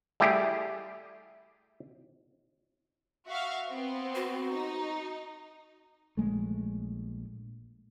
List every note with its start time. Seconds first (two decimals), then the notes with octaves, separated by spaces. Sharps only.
0.20 G3 A3 E4 G4 G#4
3.27 F#4 E5 F5
3.70 B3 C4 C5
4.15 F#4
4.52 D#4
6.17 A#1 G#3 A3